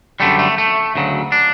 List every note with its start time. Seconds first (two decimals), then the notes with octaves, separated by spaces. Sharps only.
0.20 F#2 D3 G3 A3
0.39 A3
0.58 A3
0.96 D2 C#3 F#3
1.32 D4